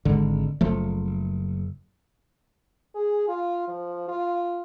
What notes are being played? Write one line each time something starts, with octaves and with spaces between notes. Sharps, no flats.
G#1 D3 G#3
F#1 F3 A3
G#4
F4
F3
F4